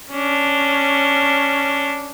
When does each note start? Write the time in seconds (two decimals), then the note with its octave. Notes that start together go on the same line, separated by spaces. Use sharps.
0.11 C#4 D4